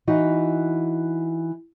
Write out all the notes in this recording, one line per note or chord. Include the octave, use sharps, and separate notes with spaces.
E3 D#4 F#4